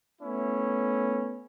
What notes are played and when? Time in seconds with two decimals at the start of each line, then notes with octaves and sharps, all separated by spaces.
0.21 A3 B3 C#4 E4